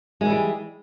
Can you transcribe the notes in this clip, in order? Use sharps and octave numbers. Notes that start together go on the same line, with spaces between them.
E3 G3 G#3